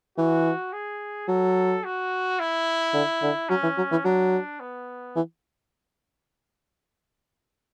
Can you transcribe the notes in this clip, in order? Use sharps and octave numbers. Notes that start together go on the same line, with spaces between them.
E3 F#4
G#4
F#3 A4
F#4
E4
D3
D3
F#3 C#4
E3
F#3
E3
F#3 D4
B3
E3